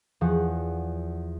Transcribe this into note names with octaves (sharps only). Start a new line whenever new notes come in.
E2 F3 F#5 C#6